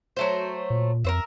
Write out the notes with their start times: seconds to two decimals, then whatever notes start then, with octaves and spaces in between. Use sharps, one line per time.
0.17 F#3 A3 C5
0.70 A#2
1.04 F2 A#4 C5 E5